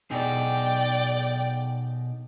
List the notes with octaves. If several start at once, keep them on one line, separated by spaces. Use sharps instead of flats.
B2 D#4 G#4 D5 G5